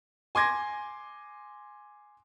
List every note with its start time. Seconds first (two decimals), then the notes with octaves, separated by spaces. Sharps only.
0.35 G#5 C6 D6 G#6 A#6